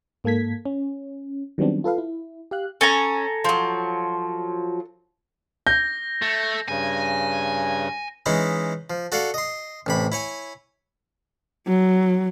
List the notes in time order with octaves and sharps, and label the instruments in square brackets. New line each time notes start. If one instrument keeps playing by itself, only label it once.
[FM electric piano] G#2 A#3 A4 G#6 B6
C#4
D#3 F#3 G3 B3 C4 D4
F4 A4 B4 F5
E4
G4 F5 F#6
[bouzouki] C#4 [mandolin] A4 G#5 A#5
[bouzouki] F3 F#3
[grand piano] G6 [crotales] A#6
[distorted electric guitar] A3
[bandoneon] G2 C#3 [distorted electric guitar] G#5
[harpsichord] E3 G#3 C#4 D#4 E4
F3
F#4 A4 D5 F5
D#5 C6
A1 C3 B5
E4 C#5 G#5
[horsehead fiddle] F#3